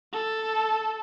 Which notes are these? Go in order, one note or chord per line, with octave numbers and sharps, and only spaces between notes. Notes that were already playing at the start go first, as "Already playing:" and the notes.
A4